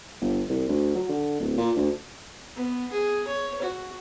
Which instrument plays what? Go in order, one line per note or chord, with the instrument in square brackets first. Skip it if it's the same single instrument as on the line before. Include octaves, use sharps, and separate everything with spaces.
[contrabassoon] G1
C2
D2
F#3
D3
D1
A#2
D2
[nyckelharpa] B3
G#4
C#5
F#4